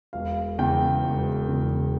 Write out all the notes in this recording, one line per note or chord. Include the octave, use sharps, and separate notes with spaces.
E1 F5
E2 C#3 G5
E1
E2 C#3